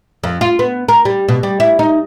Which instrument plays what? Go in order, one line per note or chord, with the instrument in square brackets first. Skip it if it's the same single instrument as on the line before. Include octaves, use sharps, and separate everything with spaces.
[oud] F2
F4
B3
A#4
G3
B2
G3
E4
D#4